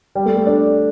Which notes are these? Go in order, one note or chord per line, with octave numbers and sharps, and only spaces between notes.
G3
A3
A3
D4